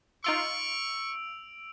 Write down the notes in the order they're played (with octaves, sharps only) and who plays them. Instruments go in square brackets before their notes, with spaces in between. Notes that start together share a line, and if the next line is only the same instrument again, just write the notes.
[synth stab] D#4 F4 C6 [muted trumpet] C#6 [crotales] E6 D7 F7